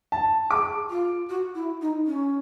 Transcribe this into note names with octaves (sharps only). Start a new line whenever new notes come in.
A5
G#4 D6
F4
F#4
E4
D#4
C#4